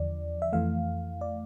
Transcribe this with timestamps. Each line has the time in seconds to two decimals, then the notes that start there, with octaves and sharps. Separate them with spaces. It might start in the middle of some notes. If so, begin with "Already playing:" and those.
Already playing: E2 D3 F3 D5
0.42 E5
0.53 F2 E3 A3 F5
1.21 D5